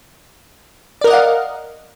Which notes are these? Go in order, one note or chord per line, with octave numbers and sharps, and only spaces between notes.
A#4 D5 D#5 F5 F#5